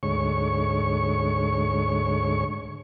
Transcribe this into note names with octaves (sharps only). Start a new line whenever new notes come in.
D2 G#2 C#5 C#6